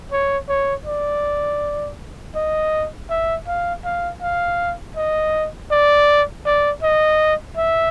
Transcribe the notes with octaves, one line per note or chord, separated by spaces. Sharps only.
C#5
C#5
D5
D#5
E5
F5
F5
F5
D#5
D5
D5
D#5
E5